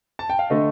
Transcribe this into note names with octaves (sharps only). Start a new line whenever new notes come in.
A5
G5
F5
D3 A3 D#5